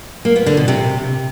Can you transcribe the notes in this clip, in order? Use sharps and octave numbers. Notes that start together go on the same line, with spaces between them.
A#3
B3
D3
B2
C3